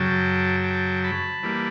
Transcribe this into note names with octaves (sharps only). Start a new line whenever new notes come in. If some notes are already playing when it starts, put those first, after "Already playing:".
Already playing: F#2 C#3 F#3 G5 A5
G5 A5
A5 B5
E3 G3 A#3